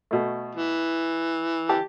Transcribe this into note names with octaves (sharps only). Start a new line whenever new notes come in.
B2 A3
E3
G4 A5